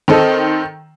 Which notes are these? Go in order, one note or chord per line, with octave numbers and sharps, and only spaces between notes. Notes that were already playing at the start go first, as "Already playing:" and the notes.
D#3 C4 A4 D#5